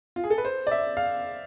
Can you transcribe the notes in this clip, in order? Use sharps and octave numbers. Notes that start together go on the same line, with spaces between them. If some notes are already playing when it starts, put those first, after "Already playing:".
F4
G#4
A4
B4
C5
D5
E5
F5